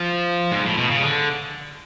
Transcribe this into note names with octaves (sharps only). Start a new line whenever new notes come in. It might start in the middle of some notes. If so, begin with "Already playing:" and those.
Already playing: F3
G#2
A2
B2
C#3
D3